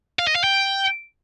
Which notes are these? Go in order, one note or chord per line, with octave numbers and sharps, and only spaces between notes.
F5
D#5
F5
G5